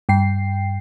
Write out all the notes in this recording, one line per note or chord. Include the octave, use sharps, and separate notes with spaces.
G2 G5 C7